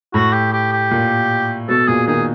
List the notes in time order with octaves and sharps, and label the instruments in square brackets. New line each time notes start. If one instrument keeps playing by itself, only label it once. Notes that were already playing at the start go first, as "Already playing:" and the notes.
[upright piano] A2 [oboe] F#4
[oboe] G4
G4
G4
[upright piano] A#2
[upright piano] B2 [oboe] A4
[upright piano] A#2 [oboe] G#4
[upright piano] D#3 [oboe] G#4